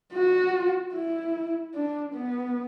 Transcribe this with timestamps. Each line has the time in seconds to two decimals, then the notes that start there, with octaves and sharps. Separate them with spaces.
0.13 F#4
0.94 E4
1.74 D4
2.14 B3